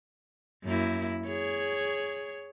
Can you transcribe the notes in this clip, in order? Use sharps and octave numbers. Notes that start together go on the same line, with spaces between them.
F#2 A#3 E4
G#4 C#5